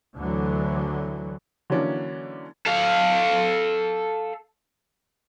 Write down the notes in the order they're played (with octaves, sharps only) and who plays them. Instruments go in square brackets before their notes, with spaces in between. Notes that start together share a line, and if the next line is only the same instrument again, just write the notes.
[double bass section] D2 D3 E3 F#3
[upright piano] D3 E3 F#3 A#3 C#4 D4
[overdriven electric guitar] A4 F5